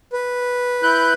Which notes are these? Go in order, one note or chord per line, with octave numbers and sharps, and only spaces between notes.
B4
E4 F#6 G6